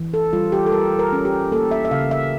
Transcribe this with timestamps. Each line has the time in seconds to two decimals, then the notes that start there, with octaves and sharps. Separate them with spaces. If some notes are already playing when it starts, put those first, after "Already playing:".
Already playing: E3
0.14 A4
0.33 G3 F4
0.52 G4
0.66 A4
0.72 G3 A#4
0.99 A#4
1.13 C#4
1.25 G4
1.52 A#3 A4
1.71 E5
1.85 E5
1.91 C#3 F5
2.11 E5